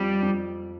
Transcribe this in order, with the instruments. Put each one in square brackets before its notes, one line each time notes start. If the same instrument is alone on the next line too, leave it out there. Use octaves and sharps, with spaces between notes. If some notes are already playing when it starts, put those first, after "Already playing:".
Already playing: [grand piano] F2 F4 [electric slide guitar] G3
[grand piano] F2